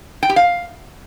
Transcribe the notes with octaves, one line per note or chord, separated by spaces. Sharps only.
G5
G4
F5